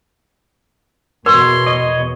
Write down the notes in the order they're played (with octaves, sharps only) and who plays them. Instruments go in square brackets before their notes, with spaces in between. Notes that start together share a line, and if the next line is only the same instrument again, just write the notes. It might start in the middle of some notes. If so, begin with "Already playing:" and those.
[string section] E2 B2 [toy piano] A#4 [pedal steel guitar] C#5 [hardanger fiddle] C6
[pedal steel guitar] C#5 D#5